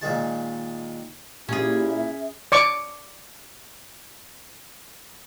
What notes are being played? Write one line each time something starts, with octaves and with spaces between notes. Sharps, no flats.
A#2 D#3 G#3 A5
A#2 C#4 E4 G4 G#4
E5
D5 C#6 D6